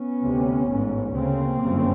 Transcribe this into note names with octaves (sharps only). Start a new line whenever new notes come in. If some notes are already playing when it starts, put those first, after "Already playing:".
Already playing: B3 C#4
D2 C3
A1 G#2
D2 C#3 A#3 C4
G1 F#2 C#3